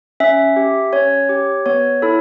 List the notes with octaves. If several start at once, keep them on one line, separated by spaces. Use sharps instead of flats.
C#4 E5
G4
C#4 C#5
G4
B3 C#5
E4 A4